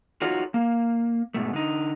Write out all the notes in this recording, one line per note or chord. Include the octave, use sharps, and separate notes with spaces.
D#4 F4 F#4 A4 C#5
A#3
G#2 B2 A3
D3 D#4